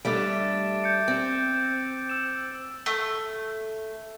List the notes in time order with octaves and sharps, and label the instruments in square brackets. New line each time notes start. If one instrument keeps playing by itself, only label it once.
[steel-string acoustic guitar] G3 A3 D4 [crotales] D6 A6 D7
[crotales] A6
G6 C#7
[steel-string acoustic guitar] C4 [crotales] D7
[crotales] E6 E7
[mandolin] A3